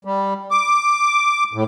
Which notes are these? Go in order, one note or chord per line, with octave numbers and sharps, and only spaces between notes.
G3
D6
A2